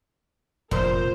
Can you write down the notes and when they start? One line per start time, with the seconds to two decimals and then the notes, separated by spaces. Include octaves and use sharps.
0.71 F1 A#2 A#4 C5